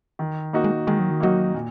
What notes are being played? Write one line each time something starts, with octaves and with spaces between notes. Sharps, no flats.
D#3
A#3 D#4 F#4
G#3
D#3 G#3
F#3
D#3
F#3 A#3 D#4 F#4
A#2